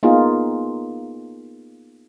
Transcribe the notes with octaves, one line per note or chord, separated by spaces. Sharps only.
A#3 B3 D#4 F4 G#4